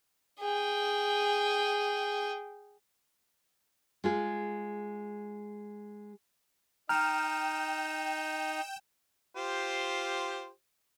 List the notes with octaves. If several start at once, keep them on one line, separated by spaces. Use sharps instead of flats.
G#4 G5
G#3 F4 G#4
D#4 G5 A#5 F6 E7
F4 G4 C5